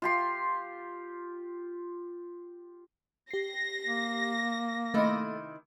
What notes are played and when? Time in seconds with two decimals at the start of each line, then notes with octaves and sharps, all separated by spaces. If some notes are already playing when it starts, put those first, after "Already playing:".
0.02 F4 G4 C6
3.31 G4 A#6 C7
3.86 A#3
4.94 C3 D#3 A3 E4 D#5